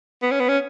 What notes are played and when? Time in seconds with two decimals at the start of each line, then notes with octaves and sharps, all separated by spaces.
0.22 B3
0.31 C#4
0.40 B3
0.49 C#4